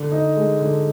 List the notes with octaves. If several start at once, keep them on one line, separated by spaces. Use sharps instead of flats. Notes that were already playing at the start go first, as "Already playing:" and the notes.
Already playing: D3
D#4
G#3
D3